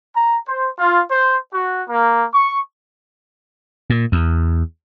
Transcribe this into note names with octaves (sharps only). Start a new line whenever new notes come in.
A#5
C5
F4
C5
F#4
A#3
C#6
A#2
E2